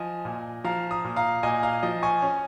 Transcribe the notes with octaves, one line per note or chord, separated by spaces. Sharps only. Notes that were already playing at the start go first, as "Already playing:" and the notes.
Already playing: F3 D#5 G#5
A#2
F3 F5 A#5
A#5 D#6
A#2
F5 A#5
A#2 D#5 G#5
F5 A#5
F3 D#5
G#5 C#6
C#4